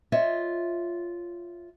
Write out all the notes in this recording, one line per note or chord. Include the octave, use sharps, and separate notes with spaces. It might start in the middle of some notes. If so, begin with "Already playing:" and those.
F4 C#5 D#5 E5